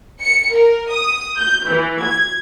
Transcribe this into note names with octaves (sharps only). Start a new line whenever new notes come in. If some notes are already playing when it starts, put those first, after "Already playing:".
C#7
A#4
D#6
G6
E3
G#6